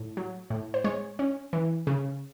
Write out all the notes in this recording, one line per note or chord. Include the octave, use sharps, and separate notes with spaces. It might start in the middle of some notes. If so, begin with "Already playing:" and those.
Already playing: A2
F#3
A2
C5
G#3 C#5
C#4
E3
C#3